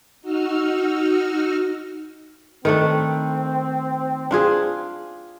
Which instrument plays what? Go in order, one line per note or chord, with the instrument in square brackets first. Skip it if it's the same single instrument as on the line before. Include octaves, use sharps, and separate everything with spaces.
[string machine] D#4 F#4 E6 F6
[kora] D#3 A3 D4 [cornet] C4
[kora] D4 F4 G#4